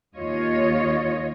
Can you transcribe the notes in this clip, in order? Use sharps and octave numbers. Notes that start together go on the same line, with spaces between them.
D#2 F4 C#5 D#5